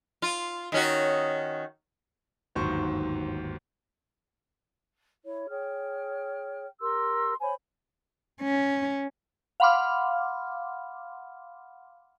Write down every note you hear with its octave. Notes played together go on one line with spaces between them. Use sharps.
F4
D#3 C#4 F#4
G1 D#2 G#2 F#3 C5 C#6
E4 C#5
G#4 C#5 G5 F6
G4 A#4 C6 E6
C5 C#5 G#5 B5
C#4
F5 F#5 B5 C6 D6 F6